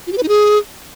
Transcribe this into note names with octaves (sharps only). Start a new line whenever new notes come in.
F4
G4
B4
D#4
G#4